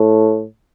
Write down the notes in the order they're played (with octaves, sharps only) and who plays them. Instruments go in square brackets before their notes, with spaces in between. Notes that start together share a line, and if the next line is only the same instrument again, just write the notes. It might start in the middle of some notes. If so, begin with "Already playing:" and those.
Already playing: [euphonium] A2